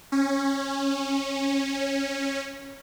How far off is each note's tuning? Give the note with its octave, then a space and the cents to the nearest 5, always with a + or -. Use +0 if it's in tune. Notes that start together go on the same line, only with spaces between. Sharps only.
C#4 -15